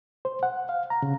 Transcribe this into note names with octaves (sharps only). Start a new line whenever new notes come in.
C5
F#5
F5
A#5
C#3